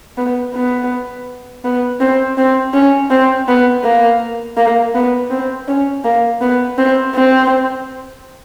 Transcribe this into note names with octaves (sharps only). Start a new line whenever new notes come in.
B3
B3
B3
C4
C4
C#4
C4
B3
A#3
A#3
B3
C4
C#4
A#3
B3
C4
C4